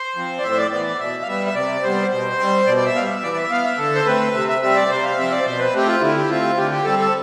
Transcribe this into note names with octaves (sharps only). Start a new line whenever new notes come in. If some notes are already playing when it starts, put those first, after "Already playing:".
Already playing: C5
F3 C4
D5
A2 E5
C5
D5
E3 B3 D5
D5
B2 E5
F5
G3 B3 E5
E5
C3 D5
G3 B3 C5
B2 C5
G3 C4
B2 D5
D5
E5
G3 B3 F5
E5
E3 D5
E5
B3 F5
E5
D3 A4
C5
A3 C4 B4
C3 E5
E5
G3 C4 E5
D5
C3 C5
F5
F3 C4 E5
D5
B2 C5
B4
A3 C4 G4
F4
D3 E4
G4
A3 C4 F4
D3 G4
G4
G3 C4 A4
A4